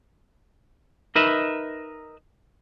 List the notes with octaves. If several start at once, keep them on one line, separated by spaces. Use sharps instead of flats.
D#4 A#4 B4 D#5 E5